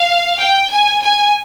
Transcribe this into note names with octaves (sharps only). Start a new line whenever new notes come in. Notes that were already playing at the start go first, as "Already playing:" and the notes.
Already playing: F5
G5
G#5
G#5